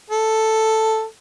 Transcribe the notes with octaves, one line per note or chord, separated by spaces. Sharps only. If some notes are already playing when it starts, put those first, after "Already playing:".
A4